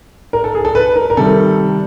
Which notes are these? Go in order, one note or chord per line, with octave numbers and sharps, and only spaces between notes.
A#4
A4
G#4
A4
B4
A#4
A#4
C3 D#3 G3 A4